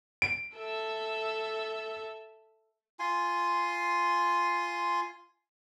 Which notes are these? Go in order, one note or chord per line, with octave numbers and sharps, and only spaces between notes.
D7
A4 E5
F4 G#5 C6